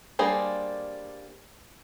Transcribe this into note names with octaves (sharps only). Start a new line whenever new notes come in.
G3 A#3 D4 G#4 C5